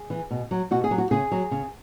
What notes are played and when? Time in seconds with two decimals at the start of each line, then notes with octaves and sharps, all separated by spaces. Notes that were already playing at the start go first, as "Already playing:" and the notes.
Already playing: G#4
0.10 E3
0.31 B2
0.51 F#3
0.71 B2 F#4
0.84 G#4
0.91 F#3
0.98 F#4
1.11 C#3 G#4
1.32 F#3
1.51 C#3